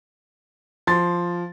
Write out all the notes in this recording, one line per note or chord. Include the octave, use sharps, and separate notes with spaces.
F3 C6 A6